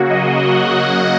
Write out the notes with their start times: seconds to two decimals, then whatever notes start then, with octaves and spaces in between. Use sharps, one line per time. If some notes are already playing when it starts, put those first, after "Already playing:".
Already playing: C#3 F#3 A#3 F#4
0.09 D#5
0.49 F#5